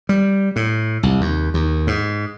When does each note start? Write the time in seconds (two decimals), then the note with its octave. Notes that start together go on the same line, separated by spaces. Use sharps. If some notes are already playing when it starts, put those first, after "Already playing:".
0.09 G3
0.56 A2
1.03 C2
1.21 D#2
1.54 D#2
1.87 G#2